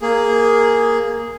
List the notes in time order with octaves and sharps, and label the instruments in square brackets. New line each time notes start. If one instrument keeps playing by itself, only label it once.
[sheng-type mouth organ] A#3 G#4